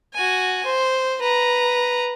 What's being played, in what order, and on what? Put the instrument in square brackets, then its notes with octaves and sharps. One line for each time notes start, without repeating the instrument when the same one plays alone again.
[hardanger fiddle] F#4 G#5
C5
B4 A#5